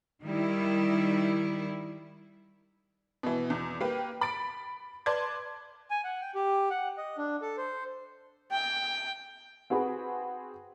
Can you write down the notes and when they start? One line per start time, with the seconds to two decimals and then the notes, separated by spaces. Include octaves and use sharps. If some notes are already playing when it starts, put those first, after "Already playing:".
0.22 D#3 G3 E4
3.23 B2 E3
3.50 E2
3.81 A#3 G4 B4
4.21 B5 A6 D7
5.06 B4 D5 A5 C6 G#6
5.90 G#5
6.04 F#5
6.21 G5
6.35 G4
6.71 F#5
6.98 D#5
7.18 D4
7.42 A4
7.57 C5
8.51 G5
9.70 C4 F#4 G#4 B4 B5